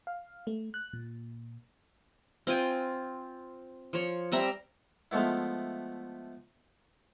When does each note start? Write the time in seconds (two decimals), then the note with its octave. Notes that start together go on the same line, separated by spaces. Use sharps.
0.07 F5
0.47 A3
0.74 F#6
0.93 A#2
2.47 C4 F4 G5 G#5
3.93 F3 C#5
4.32 G3 C4 E5 A#5
5.11 F3 G#3 A3 B3 E4